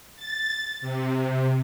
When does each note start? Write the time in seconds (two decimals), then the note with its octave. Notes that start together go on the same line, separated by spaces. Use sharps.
0.16 A6
0.81 C3